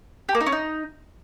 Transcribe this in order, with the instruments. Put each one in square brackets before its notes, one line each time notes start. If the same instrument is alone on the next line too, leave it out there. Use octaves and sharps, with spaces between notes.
[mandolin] G4
A#3
D#4
C#4
D#4